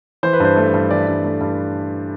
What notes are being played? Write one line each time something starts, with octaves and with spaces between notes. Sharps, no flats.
E3 C5
B4
G2 C5
A3
G2
E3 D5
G2
A3
G2